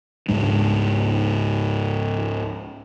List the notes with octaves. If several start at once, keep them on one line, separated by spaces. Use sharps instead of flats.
C#2 G#2 G#3 D4